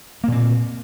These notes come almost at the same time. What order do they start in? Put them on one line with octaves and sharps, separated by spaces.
A#3 A#2 C4